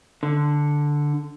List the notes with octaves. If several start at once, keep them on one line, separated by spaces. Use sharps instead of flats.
D3